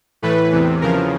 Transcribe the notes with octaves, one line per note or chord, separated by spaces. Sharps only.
A2 E3 A3 B4
E2 C3 E3
E2 C#3 F3 A#4